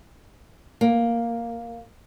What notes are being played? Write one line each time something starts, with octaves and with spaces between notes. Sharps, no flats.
A#3